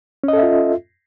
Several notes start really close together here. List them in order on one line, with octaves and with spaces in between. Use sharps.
C#4 D#5 A4 E5 F4